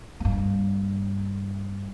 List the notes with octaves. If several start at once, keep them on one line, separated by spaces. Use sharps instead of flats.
G2 A#3